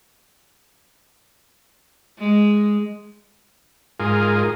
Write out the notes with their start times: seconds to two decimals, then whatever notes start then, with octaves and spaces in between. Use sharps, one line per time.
2.19 G#3
4.00 G#2 F4 G#4 A#4